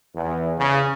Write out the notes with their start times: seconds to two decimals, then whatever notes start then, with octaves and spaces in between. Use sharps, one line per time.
0.15 E2
0.58 C#3